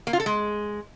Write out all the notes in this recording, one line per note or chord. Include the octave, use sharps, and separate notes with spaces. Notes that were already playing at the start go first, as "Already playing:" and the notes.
A#3
F4
A4
G#3